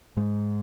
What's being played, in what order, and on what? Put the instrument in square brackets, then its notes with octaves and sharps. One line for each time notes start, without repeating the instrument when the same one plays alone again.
[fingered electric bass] G#2 G#3